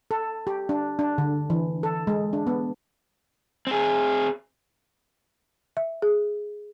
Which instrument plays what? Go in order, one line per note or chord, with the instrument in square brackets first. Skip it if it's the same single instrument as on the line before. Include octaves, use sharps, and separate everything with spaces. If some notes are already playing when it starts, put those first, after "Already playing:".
[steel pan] A4
G4
D4
D4
D3
E3
A4
G#3
D4
B3
[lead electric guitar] C4 G#4
[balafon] E5
G#4